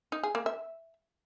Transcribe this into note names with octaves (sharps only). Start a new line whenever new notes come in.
D#4
G#4
A#3
E5